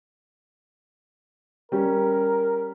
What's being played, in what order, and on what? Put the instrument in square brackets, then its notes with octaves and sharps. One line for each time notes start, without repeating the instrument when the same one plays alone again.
[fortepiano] G3 C#4 [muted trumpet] A#4